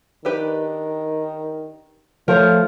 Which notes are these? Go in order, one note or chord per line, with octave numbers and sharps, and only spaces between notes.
D#3 D4 G4 B4
F3 A3 A#4 C#5